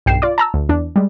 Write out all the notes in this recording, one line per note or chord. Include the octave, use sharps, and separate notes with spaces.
B1 G2 G5 C7 E7
F4 D5 D6
A5 A#5 E6
D2
E2 D4
G3 G#3